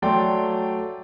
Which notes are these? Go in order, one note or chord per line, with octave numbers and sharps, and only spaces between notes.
F#3 A3 D5 G5 C6